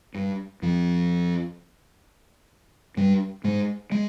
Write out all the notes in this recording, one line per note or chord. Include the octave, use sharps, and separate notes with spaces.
G2
F2 F3
G2 G3
G#2 G#3
G#3